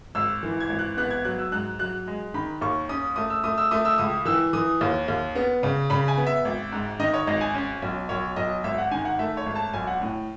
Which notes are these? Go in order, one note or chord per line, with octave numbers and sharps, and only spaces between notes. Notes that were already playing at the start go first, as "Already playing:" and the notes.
G#1 E6
E3
G#6
G#1
F#6
B3 F#6
G#6
F#3 F#6
E6
G#2 F#6
F#3 F#6
G#3
D#3 B5
D#2 C#6
C#4 D#6
A3 D#6
E6
A3 D#6
E6
A3 D#6
E6
C#2 D#6
E3 E6
E3 D#6
D#2
D#2
B3
C#3
C#3 B5
G#5
B3
E5
G#1
G#2
D#3 D#5
C#5
G#1 D#5
G#5
C#4
B1
B1 C#5
B1 D#5
G#1 E5
F#5
D#3 G#5
F#5
A3 E5
C#5
G#1
A5
B1 G#5
F#5
A2